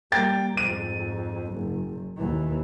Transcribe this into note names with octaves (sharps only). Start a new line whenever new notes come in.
G3 A#3 G5 A6
F2 G#2 D#7
F#1
D#2 E3